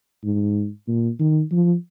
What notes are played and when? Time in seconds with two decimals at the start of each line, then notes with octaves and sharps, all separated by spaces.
0.24 G#2
0.88 A#2
1.19 D#3
1.52 F3